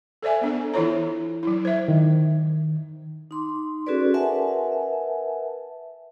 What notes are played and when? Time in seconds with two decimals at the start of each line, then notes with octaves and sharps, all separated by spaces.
0.23 A4 C5 D5 E5 G#5
0.42 B3 D4 A4
0.74 E3 E4 F4 C#5 A#5
1.43 F#3 E4
1.65 C5 E5
1.88 D#3
3.31 D#4 C6 D6
3.87 C#4 F#4 G#4 A4 B4 D5
4.14 A#4 B4 E5 F#5 G#5 A5